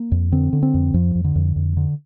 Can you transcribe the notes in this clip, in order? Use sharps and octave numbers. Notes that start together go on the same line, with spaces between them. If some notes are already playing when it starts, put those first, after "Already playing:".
Already playing: A#3
F2
D3 C4
D3
C4
F2
F2 F3
F2
D3
F2
F2
D3